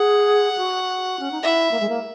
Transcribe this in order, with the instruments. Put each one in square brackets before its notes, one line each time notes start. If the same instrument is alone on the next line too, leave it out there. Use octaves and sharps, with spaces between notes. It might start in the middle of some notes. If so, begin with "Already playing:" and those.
Already playing: [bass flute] G#4 [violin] F#5
[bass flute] F#4
C#4
D#4
[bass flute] E4 [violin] E5
[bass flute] A#3
G#3
A#3